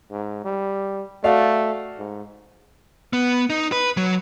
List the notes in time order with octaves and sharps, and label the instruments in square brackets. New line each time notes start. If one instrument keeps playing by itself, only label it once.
[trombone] G#2
G3
[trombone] A3 [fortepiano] F#4 D5 F5
[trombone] G#2
[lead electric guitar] B3
D#4
B4
F#3